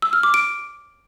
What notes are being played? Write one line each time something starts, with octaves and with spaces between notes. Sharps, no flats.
E6
F6
D6
D7